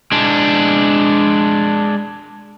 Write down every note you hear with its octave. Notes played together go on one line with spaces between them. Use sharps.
G#3 D4